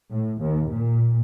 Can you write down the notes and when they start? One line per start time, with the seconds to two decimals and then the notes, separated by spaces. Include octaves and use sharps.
0.11 A2
0.41 D#2
0.71 A#2